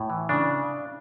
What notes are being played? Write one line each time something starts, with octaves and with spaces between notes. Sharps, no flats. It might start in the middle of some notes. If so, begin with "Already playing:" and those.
Already playing: A2
E3
C#3 D4